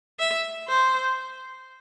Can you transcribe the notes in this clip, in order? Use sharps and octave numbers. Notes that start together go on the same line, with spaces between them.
E5
C5